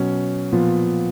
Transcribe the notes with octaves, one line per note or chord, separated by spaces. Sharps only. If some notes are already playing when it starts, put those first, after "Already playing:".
Already playing: B2 F#3 C#4
A#2 F3 B3 F4